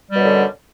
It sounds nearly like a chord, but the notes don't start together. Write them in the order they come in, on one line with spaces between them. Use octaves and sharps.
G3 B2 F#2 D3